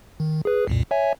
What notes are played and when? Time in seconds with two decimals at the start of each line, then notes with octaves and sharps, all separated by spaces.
0.20 D#3
0.45 G#4 B4
0.67 C2 F2 A#2
0.91 C#5 E5 G#5